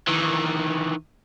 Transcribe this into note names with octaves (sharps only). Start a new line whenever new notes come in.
D#3 E3